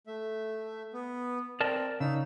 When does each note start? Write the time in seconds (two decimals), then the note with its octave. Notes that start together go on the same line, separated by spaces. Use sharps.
0.07 A3 E5
0.93 B3
1.60 C4 A#4 D5 A5
2.00 C#3 D#4 E6